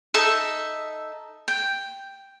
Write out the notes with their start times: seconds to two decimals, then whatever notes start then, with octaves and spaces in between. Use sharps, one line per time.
0.14 D#4 A4 E5
1.48 G5